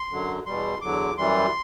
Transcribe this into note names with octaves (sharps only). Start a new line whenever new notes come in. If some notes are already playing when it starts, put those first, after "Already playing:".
Already playing: C6
F#2 D3 F#3
E2 B2 G3 C6
E2 D3 F#3 D6
F#2 E3 G3 C6